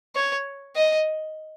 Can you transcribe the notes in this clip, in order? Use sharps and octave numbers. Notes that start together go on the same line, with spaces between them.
C#5
D#5